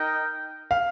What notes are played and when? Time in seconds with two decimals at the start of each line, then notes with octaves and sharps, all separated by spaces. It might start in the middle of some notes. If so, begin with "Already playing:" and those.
Already playing: D#4 A#4 D#5 G5
0.71 F5